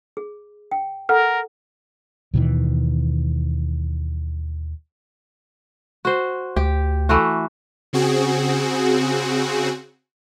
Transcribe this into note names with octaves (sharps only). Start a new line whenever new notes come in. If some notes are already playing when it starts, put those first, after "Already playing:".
G#4
G5
A4 A#4 F#5 F6
D#2 B2 D#3 E3
F#4 C5
D2 G4
E3 A3 F#4
C#3 C4 F#4 G#4